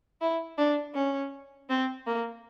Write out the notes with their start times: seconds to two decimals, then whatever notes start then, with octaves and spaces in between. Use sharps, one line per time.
0.21 E4
0.58 D4
0.95 C#4
1.69 C4
2.07 A#3